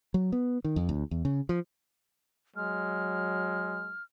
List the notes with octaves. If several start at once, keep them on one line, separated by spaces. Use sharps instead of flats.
F#3
B3
D#3
F2
D2
E2
C#3
F3
F#3 G#3 F6